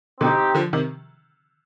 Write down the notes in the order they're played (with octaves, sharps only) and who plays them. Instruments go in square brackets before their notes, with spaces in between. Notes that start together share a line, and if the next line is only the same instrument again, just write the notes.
[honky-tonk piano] B2 D3 [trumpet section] C4 D#4 G4
[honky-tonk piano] D3 F3
C3 D#3